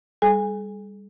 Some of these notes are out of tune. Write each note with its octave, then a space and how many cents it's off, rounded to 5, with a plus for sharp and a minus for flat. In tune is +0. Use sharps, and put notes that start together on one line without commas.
G3 +20 G#4 +45 G#5 -25